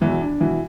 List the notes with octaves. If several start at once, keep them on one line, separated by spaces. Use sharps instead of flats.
E2 B2 E3 E4
D4
B2 E3 E4